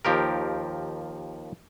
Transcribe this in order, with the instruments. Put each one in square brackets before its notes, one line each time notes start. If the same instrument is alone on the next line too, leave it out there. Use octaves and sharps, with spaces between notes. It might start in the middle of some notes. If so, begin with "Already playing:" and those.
[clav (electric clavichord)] D#2 F3 G4 A#4